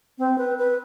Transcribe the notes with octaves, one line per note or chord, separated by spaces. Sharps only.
C4
B4
B4